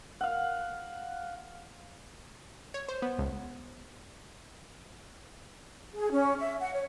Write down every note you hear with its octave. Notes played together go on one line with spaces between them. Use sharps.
F5 F#5
C#5
C5
B3
C#2
G#4
C#4
E5
F#5
C#5